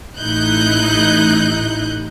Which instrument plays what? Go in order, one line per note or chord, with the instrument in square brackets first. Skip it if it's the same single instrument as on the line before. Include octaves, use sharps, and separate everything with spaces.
[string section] A1 A2 D#4 E4 F#6 G6